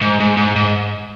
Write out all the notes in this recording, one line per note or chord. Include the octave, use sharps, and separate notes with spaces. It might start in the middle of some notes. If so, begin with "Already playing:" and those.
G#2
G#2
G#2
G#2